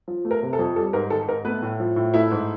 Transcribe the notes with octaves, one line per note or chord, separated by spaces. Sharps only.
F3
A3
A#4
C3
A4
F2
G3 A4
G#2 A#4
D#3 A4
G#2 A#4
A3 B3 B4
A2
F3
A2
A3 E4 E5
G#2